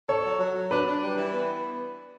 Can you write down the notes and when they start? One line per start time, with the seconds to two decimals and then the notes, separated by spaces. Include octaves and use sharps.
0.09 A4 C#5
0.24 F#3
0.40 F#3
0.55 F#3
0.70 D4 B4
0.86 D4
1.02 G3
1.17 E3
1.33 B3